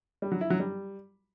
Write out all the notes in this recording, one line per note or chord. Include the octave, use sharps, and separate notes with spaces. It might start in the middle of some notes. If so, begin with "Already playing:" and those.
G3
F#3
E4
F#3
G3